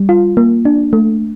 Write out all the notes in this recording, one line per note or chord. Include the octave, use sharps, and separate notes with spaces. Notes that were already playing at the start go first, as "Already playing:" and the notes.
Already playing: G3
F4
A#3
D4
A3